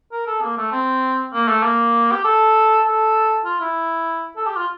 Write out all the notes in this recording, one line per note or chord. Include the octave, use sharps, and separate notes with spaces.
A#4
A4
A#3
A3
C4
A#3
A3
A#3
G4
A4
A4
F4
E4
A4
G4
F4